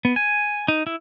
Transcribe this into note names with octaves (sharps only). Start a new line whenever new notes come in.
B3
G#5
D#4
E4